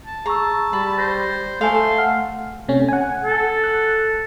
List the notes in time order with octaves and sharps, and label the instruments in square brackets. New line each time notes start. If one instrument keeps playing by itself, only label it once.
[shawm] A5
[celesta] G#4 C#6 E6 [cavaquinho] A#5
[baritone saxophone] G3 [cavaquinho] B5
[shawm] C5 [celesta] A6 A#6
[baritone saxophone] A3 [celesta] A4 E5 G#5 [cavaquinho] C5 F5 [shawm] C6
[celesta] F#5 F6 C7
[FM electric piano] C3 A3 C#4
F#5 G#5
[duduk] A4
[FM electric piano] F#6